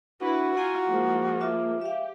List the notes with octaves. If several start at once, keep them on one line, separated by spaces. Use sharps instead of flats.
D4 E4 F#4 B4
E4 F4 F#5 G#5 A#5
F3 G#3 A#3
F4 E5 D6
G4 E5 F5